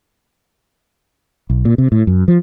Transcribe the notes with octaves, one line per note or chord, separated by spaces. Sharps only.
B1
A#2
C3
A2
F#2
F3